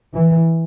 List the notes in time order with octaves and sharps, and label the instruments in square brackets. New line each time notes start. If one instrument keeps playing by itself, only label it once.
[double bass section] E3